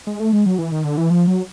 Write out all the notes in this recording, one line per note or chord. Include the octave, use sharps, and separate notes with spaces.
G#3
A3
G#3
F#3
E3
D#3
D3
E3
F3
F#3